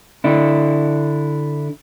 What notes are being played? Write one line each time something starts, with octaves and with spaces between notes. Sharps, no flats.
D3 D4 E4